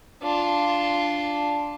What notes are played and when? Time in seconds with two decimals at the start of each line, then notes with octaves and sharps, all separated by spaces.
0.23 D4 F4